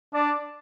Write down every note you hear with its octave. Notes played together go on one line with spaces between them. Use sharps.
D4 D5